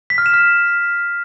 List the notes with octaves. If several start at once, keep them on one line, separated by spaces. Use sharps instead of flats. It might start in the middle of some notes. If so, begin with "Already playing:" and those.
B6
F6
E7
F6